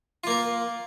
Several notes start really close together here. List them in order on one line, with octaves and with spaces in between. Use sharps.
F4 A#3 A#4